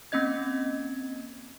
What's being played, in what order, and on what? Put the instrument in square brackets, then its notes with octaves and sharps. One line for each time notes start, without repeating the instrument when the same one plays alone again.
[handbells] A#3 C4 C#4 D#5 G#6